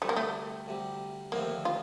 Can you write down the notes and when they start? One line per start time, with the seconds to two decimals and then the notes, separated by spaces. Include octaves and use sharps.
0.02 D2 C3 G3 A3
0.09 A#3
0.16 A3
0.66 D2 C3 G3
1.32 D#2 D3 F3 A3 A#3 C4
1.65 F4